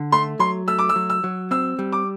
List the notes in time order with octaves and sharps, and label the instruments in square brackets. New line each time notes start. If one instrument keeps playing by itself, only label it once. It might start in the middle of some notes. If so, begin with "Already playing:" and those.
Already playing: [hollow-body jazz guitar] D3
[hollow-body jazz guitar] A3 [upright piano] C6
[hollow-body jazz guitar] F#3 [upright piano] C6
[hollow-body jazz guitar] A3 [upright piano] E6
[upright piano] D6
E6
[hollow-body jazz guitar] F#3
[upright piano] E6
[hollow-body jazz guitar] F#3
[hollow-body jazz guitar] C4 [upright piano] E6
[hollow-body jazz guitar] G3
[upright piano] D6